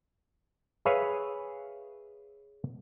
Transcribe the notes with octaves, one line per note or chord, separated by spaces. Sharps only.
G#4 B4 C#5 E5 F5